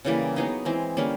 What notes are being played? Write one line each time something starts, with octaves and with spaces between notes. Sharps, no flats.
C#3 E3 G3 A#3
F#3 B3 D#4 G#4
E3 G#3 C4
D3 G3 A#3 C#4